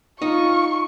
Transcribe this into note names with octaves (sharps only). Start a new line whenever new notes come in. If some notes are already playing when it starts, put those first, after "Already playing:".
D#4 F4 C#6